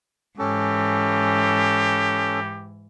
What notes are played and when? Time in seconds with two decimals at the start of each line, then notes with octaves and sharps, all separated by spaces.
0.39 G#2 E3 C#4 G4 A4